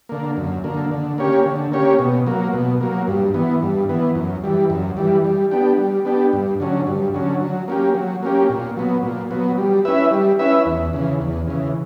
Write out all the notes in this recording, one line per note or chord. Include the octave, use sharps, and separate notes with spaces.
D3 A#3
F#2
D3 A#3
D3
A#3 C#4 G4 C#5
D3
A#3 C#4 G4 C#5
B2
F#3 A#3
B2
F#3 A#3
G2
E3 B3
G2
E3 B3
F#2
E3 G3
F#2
E3 G3
G3
B3 D4 G4
G3
B3 D4 G4
G2
D3 F#3 C#4
G2
D3 F#3 C#4
F#3
A#3 C#4 G4
F#3
A#3 C#4 G4
A#2
F#3 B3
A#2
F#3 B3
G3
C#4 E4 B4 E5
G3
C#4 E4 B4 E5
E2
C#3 E3
E2
C#3 E3